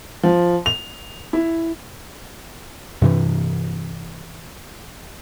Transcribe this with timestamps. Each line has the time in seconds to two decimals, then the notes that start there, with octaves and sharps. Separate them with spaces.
0.23 F3
0.66 F7
1.33 E4
3.02 G2 C3 E3